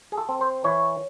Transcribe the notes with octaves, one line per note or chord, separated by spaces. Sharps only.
G#4
A4
C4
C5
E3 C#5